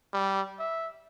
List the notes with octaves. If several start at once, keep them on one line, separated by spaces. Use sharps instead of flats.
G3
E5